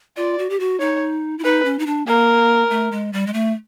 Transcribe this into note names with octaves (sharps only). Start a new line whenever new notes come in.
F4 D5
F#4
G4
F#4
D#4 C#5
E4
D#4 B4
C#4
D#4
D4
A#3 A#4
A3
G#3
G3
G#3
A3